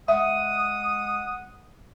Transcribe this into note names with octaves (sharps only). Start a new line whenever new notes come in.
G#3 E5 F#5 D#6